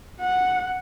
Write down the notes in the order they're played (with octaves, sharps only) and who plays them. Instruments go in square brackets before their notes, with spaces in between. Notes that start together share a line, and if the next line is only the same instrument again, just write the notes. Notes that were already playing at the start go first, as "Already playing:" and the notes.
[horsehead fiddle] F#5